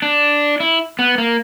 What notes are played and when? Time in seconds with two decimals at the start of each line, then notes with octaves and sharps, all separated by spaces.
0.02 D4
0.60 E4
0.99 B3
1.18 A#3